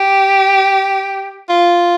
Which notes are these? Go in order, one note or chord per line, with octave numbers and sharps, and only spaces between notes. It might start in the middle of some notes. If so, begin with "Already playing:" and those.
Already playing: G4
F4